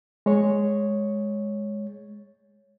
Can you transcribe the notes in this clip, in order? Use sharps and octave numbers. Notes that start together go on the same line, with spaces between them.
G#3 C#5